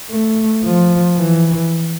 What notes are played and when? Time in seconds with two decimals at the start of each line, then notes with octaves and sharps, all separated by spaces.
0.10 A3
0.64 F3
1.18 E3